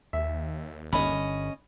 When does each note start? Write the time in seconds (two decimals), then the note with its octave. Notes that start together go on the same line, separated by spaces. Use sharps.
0.13 D#2 E5
0.93 G1 C#4 D#5 B5